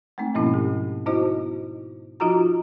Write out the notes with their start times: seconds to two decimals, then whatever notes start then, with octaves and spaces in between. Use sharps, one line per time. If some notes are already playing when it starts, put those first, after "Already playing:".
0.18 G#3 A3 C4 D#4
0.35 G#2 B2 F3 A#3 C#4 E4
0.54 G4
1.06 B3 D#4 E4 F#4 C5 D#5
2.20 F3 D#4 F4 F#4 A#5